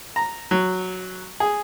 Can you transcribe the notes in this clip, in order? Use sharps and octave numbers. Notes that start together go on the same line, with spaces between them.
A#5
F#3
G#4